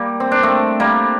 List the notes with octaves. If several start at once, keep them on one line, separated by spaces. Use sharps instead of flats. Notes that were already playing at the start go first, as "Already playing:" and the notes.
Already playing: G3 A#3
C4
D4
A3 C4
G3 A#3